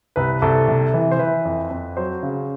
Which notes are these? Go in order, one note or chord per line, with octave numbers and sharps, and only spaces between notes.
C2 B4
C2 A4
C3
E3
C5
E3 B4
F2
F2
F#3 C5
C#3